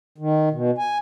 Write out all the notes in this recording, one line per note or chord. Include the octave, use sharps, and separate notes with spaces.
D#3
B2
G#5